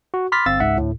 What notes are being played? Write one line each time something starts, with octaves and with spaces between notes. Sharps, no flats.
F#4
B5 C6 D6 F6 A6 B6
G1 C4 F5 E6 A6
C#2 G#2 E5 F#5
D2 A2